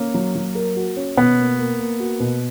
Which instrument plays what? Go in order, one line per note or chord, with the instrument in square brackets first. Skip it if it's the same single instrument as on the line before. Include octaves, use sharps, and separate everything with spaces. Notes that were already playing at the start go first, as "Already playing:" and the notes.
Already playing: [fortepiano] A#3 [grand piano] C#4
[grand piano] F#3
F#3
A#4
F#4
C#4
[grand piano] B2 [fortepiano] B3
[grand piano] A#3
A#3
A#3
F#4
B2